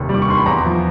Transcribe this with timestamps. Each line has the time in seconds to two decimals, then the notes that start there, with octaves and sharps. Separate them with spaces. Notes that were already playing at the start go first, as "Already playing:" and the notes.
Already playing: F1 D#2 D#3
0.09 G3
0.14 D6
0.22 C#6
0.28 D#2 C6
0.38 B5
0.46 E2 A#5
0.65 F3